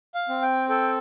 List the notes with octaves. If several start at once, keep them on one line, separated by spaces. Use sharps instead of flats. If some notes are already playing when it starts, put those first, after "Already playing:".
F5
C4
G5
A4 G5